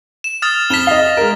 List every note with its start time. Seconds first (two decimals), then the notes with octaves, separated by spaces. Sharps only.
0.24 E7
0.42 D#6 F6 A6
0.70 F2 B6 E7 G7
0.87 D#5 F5
1.17 G#3 A#4